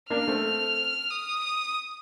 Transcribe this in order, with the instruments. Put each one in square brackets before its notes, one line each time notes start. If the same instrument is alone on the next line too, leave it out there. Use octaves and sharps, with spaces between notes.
[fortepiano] A#3 D4 [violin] F6
[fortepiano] A3 C4
[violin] D#6